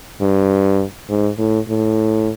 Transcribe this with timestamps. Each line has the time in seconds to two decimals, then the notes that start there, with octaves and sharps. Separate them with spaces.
0.21 G2
1.09 G#2
1.38 A2
1.69 A2